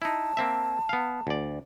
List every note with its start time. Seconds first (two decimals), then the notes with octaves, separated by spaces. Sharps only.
0.02 D#4 E4 A5
0.37 A#3 C4 E5
0.89 B3 F5
1.27 D2 D5